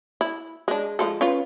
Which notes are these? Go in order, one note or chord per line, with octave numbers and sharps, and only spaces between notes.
E4
G#3 D4
F3 G#3 A4
C#4 F4 B4